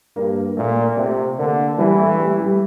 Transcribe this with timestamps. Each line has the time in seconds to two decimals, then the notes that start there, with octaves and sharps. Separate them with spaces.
0.16 G2 A#3
0.57 A#2 A3
0.97 C3 A3
1.38 D3 A#3
1.78 E3 G3
1.99 A3
2.19 G3
2.40 G3